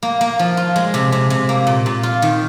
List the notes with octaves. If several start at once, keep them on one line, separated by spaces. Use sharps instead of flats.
A#3
A#3
F3
F4
G#3
C3
C3
C3
A#3
A#2
A#2
F4
D#3